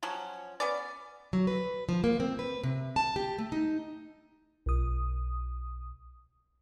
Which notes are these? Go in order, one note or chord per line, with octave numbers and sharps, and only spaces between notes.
F3 F#3 C#4
B3 C#4 D5
F#3
B4
F3
A#3
C4
B4
C3
A5
G4
A3
D#4
B1 D#6